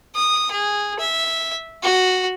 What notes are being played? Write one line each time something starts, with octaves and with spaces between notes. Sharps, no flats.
D#6
G#4
E5
F#4